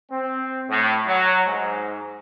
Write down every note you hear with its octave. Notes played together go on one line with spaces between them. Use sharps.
C4
A2
F#3
G#2